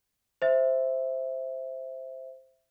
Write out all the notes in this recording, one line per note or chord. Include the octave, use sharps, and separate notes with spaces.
C5 E5